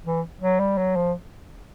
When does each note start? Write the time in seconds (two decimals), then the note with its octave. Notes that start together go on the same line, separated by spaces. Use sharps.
0.05 E3
0.41 F#3
0.60 G3
0.78 F#3
0.96 F3